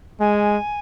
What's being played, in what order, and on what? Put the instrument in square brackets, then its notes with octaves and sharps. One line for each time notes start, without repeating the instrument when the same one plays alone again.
[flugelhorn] G#3 [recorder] G#5